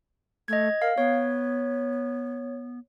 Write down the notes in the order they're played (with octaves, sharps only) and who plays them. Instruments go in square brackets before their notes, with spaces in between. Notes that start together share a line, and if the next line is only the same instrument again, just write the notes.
[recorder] A3 [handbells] D#5 G#6
[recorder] A#4 [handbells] F5
[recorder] B3 [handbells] C#5